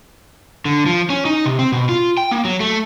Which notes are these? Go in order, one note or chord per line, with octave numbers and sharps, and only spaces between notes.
D3
F3
C#4
D#4
C3
C4
B2
F4
G5
A#3
F#3
A3